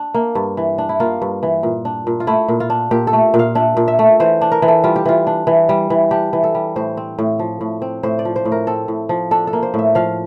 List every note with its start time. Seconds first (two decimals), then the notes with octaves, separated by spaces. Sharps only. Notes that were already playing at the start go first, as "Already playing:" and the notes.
Already playing: D4
0.14 A#3
0.35 G2
0.57 E3
0.78 D4
0.89 E4
1.00 A#3 F4
1.22 G2
1.43 E3
1.63 A#2
1.85 D4
2.07 A#2
2.20 F4
2.27 A3 E4
2.48 A#2
2.60 F4
2.70 D4
2.91 A#2 G4
3.07 A4
3.13 A3
3.34 A#2
3.39 F5
3.55 D4 E5
3.77 A#2
3.88 E5
3.99 A3
4.20 E3 C5
4.42 D4
4.52 A#4
4.62 E3
4.68 A4
4.84 G3 F4
4.96 G4
5.05 E3 F4
5.27 D4
5.47 E3
5.69 G3
5.90 E3
6.11 D4 G4
6.33 E3
6.44 A4
6.55 G3
6.76 A2 C5
6.97 C4
7.19 A2
7.39 F3
7.61 A2
7.82 C4
8.03 A2 C5
8.19 D5
8.25 F3
8.36 C5
8.45 A2
8.52 A#4
8.67 C4 A4
8.88 A2
9.09 F3
9.31 D4 A4
9.47 A4
9.53 A#3
9.63 C5
9.74 A2 E5
9.95 F3 F5